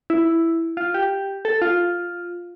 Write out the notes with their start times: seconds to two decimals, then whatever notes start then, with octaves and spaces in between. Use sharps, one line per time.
0.10 E4
0.77 F4
0.94 G4
1.45 A4
1.62 F4